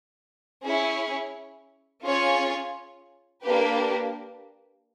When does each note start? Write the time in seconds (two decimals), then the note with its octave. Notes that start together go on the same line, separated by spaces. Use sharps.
0.63 C#4 E4 G#4 C#5
2.03 C#4 F4 G#4 C#5
3.43 A#3 D4 G4 B4